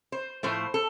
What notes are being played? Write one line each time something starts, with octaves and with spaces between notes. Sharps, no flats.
C5
A2 F3 A3 C5
A4